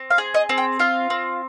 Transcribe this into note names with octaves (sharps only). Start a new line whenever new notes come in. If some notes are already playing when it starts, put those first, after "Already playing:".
Already playing: C4
F5
G#4
D#5
C4
G5
F4 F5
C4